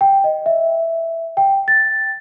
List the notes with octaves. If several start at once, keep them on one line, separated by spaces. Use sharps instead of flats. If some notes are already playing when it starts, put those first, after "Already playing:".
G5
D#5
E5
G5
A6